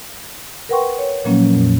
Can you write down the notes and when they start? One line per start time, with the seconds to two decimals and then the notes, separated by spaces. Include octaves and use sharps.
0.69 A#4 B4 F#5 G5 C6 C#6
0.99 C#5
1.25 A#2 F3 F#3 A#3 C#4
1.54 F2 A#2